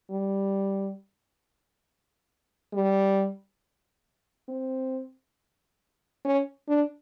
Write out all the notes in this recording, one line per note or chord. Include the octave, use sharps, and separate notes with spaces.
G3
G3
C4
C#4
D4